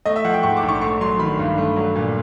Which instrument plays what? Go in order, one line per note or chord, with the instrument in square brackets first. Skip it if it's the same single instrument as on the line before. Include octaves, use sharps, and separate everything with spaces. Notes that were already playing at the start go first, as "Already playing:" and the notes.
[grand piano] A3 D#5
E5
F3 F#5
G5
G#2 C#6
D6
A#1
C#6
A3 C#6
F#3 C6
D#3 B5
G2
A3
F#3
A#2